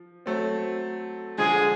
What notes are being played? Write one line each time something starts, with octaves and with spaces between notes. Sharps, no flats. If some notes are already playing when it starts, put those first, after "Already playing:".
Already playing: F3
F#3 A3 C4
D3 F3 G#3 G#4